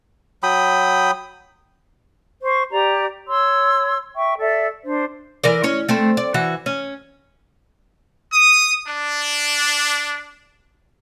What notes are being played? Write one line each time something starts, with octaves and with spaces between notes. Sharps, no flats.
F#3 G5 B5 D#6
C5 C#6
G4 D5 A#5
C#5 C6 E6
E5 G5 C#6
A4 D5 E5
D4 C5
E3 A#4 D5
C#4 C#5
A3 C4
D5
E3 F#4
C#4
D#6
D4